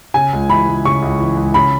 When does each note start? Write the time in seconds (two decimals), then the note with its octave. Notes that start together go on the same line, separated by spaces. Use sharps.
0.14 C#3 G#5
0.33 C#2
0.49 E3 B5
0.67 C#2
0.85 C#3 C#6
1.02 C#2
1.20 E3
1.37 C#2
1.54 C#3 B5